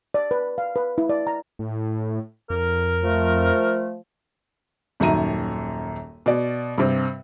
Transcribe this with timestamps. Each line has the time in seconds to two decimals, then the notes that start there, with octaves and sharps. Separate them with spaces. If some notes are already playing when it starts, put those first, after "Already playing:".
0.14 D5
0.31 B4
0.58 F5
0.76 B4
0.98 E4
1.09 D5
1.27 A#5
1.59 A2
2.50 F2 A#4
3.03 F3 A3
5.00 D#1 F#2 D#3 E5 A#5 D#7
6.26 B2 D5
6.78 G2 C3